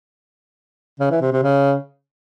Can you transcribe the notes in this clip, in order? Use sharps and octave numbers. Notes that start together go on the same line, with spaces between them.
C#3
E3
C3
C3
C#3